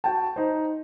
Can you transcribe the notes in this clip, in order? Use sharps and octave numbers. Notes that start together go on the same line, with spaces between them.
F#4 G5 A5
D#4 C5